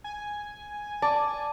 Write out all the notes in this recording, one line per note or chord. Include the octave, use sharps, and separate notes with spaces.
G#5
D5 A5